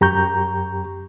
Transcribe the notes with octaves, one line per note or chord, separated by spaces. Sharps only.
F#2 G4 A#5 C#6 G6